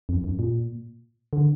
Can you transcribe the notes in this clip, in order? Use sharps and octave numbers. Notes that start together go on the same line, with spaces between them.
F2
F#2
A#2
D3